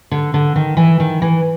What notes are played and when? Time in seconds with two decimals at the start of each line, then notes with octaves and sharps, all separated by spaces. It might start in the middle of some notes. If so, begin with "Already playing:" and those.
0.11 D3
0.34 D3
0.56 D#3
0.77 E3
1.00 D#3
1.22 E3